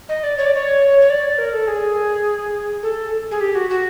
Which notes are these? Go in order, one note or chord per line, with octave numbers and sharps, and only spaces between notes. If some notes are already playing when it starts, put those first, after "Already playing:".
D#5
D5
C#5
D5
C#5
C#5
D5
A#4
A4
G#4
A4
G#4
G4
F#4
F#4